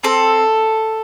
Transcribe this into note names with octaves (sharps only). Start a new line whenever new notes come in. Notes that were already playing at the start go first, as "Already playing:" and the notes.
C4 A4